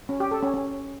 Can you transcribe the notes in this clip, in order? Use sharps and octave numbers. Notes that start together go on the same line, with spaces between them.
C#4
G4
A4
C#4
C#4